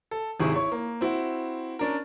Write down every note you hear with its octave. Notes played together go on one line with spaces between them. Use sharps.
A4
G#1 C3 D#3 E4 G#4 C#6
E4 C#5 C#6
A#3
C4 E4 F#4
C#4 D4 A#4